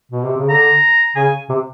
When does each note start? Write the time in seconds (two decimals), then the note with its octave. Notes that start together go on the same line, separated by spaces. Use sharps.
0.11 B2
0.24 C3
0.37 C#3
0.49 D3 A#5
1.16 C#3 G#5
1.49 C3